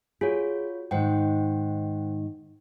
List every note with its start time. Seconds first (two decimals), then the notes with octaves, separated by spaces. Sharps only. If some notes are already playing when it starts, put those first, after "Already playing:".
0.21 F4 F#4 G#4 C#5
0.91 G#2 D#3 C5 F#5 G5